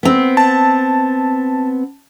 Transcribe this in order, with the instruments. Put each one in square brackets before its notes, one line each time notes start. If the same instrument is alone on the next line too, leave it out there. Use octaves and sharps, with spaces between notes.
[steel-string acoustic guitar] B3 C4
[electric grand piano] A5